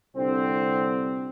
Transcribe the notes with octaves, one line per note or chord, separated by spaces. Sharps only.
C2 D3 C4